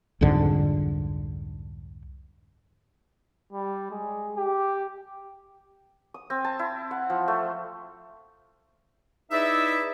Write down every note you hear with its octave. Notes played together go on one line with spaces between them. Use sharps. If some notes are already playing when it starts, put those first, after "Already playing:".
C2 F2 G#2 D3
G3
G#3
G4
D#6
C4
A5
E4
F#5
F3
A3
D#4 E4 G#4 B4 D5 E5